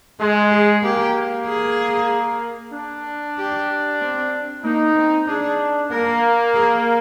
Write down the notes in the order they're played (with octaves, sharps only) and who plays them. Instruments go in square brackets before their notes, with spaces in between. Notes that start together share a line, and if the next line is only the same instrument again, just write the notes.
[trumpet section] G#3 [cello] G#4
[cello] G#4
[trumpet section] A#3 [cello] G4
[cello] G#4
[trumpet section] D4
[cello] G4
C4
[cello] A#3 [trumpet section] D#4
[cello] C4
[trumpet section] D4 [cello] G#4
[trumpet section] A#3 [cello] A#4
[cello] G#4